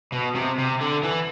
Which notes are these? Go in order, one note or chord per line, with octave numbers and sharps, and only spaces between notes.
B2
C3
C3
D3
E3